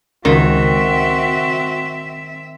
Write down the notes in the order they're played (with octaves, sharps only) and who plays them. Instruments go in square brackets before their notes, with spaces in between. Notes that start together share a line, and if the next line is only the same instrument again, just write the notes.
[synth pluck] C#2 [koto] D#3 [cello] C4 E5 [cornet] F#4